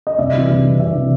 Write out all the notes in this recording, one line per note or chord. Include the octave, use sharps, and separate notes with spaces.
D#5
C2 D5 E5
C3 E3
C2
C3 E3
C2 D5 E5
C3 E3